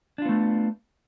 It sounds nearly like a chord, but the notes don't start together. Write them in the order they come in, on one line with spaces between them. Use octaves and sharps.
D4 F4 B3 A3